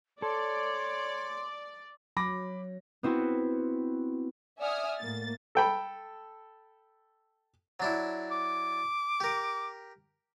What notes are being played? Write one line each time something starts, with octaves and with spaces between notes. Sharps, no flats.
A4 C#5 D5 C6
F#3 B5 D6 A#6
B3 C4 E4 F#4
D5 E5 F#5 G#5 D#6 F6
A2 A#3 A6
A4 G5 B5
F#3 D4 E4
D6
G4 A#4